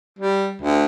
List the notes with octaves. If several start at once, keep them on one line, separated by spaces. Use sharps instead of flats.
G3
D2